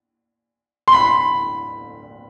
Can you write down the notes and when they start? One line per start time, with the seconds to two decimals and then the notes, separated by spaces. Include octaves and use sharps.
0.88 C6
0.93 B5